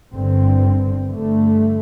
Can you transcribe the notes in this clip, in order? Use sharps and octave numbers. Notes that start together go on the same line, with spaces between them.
G1 G2 D3 C4
G2 D3 A3